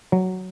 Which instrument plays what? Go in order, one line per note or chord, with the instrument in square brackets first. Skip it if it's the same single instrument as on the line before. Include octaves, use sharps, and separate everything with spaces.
[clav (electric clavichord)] F#3